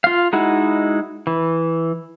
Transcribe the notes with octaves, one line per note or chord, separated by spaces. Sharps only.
F4 F5
G#3 D#4 E4 F#4
E3